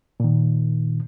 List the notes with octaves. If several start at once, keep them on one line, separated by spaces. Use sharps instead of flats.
A#2 D#3